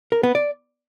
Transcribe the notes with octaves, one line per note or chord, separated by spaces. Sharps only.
A#4
B3
D5